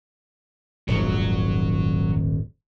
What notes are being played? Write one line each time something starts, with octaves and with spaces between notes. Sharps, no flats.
D#1 G#1 F2 F#3